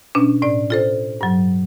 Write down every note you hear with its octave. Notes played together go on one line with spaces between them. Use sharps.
B2 C#4 D4
A2 D5
F4 A4 C5
G2 F#3